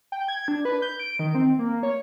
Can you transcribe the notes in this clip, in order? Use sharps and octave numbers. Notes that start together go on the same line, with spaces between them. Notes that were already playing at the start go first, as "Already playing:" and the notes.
G5
G#6
D4
B4
G6
D7
D#3
C4
A#3
C#5